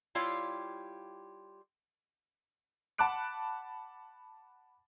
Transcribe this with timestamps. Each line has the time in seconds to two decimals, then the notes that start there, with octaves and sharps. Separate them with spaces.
0.15 G3 E4 F4 G4 C#5 F5
2.98 F#5 A5 B5 D6 F#6 D7